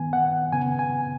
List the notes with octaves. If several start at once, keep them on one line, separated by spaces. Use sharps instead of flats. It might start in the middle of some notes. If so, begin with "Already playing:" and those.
Already playing: D#3 B3 G#5
F#5
C#3 B3 G#5
G#5